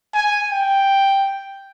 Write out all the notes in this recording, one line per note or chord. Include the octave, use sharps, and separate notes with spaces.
G#5
G5